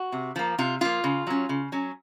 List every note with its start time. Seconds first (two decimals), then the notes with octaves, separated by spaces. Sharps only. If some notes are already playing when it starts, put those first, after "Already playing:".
Already playing: F#4
0.12 C3
0.36 F3 A#3
0.58 C3 F4
0.81 F3 A#3 F4
1.04 C#3
1.27 F#3 C#4
1.49 C#3
1.72 F#3 C#4